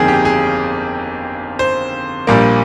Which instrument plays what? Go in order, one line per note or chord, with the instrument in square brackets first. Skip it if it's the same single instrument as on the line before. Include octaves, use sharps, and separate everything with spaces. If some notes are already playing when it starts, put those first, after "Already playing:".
Already playing: [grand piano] G1 F2 D#3 A#3 G#4 G5
G4
G#4
C5
A#1 A#2 G3 A#3